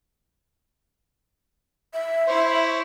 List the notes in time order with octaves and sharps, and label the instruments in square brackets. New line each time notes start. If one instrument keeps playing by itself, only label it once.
[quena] E5
[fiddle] E4 C#5 [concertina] C5